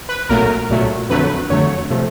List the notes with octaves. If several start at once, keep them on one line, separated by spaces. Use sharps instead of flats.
B4
B1 A#2 F#3 A3 A#4
B1 A#2 F#3 A3
F2 D3 F#3 A3 B4
F2 D3 F#3 A3 C#5
C3 F3 A3